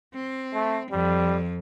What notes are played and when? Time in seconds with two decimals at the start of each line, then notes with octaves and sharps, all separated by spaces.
0.14 C4
0.54 A3
0.91 F2 G3